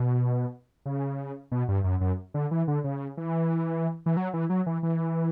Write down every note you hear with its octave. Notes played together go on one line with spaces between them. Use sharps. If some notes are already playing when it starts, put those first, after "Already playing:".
Already playing: B2
C#3
B2
G2
F#2
F#2
D3
E3
D3
C#3
E3
E3
F#3
E3
F#3
E3
E3